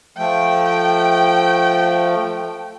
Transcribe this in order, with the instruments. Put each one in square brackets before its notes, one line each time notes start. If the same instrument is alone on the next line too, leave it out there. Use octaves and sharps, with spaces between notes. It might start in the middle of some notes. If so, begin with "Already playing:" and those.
[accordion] F3 A3 [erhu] G5